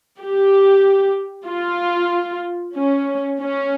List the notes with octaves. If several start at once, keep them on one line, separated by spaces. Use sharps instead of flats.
G4
F4
C#4
C#4